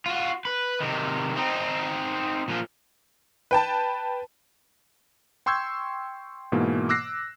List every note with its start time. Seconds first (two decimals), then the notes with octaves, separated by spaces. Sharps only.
0.06 F4 F#4
0.45 B4
0.80 C3 D#3
1.36 C4 D#4
2.48 A#2 F3
3.51 B4 G5 A5
5.46 G5 C6 C#6 E6 G6 G#6
6.52 G#2 B2 E3 A#3
6.89 D6 E6 F#6 A#6 C7